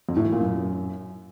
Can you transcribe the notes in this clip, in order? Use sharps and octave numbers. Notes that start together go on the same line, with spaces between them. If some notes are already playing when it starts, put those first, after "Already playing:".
F2
A2
E3
A#2
F#2